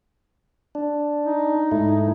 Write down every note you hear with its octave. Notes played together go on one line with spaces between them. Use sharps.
D4
D#4
G#2 A3 E4